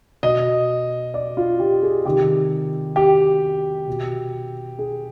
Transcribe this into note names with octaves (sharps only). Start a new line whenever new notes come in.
B2 D#5
D5
F4
G4
G#4
C3 D#3 G4
G4
B2
G#4